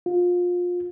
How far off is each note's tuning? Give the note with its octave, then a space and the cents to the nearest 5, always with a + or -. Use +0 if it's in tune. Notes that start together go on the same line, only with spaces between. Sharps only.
F4 +25